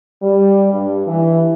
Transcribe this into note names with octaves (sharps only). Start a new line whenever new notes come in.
G3
G2
E3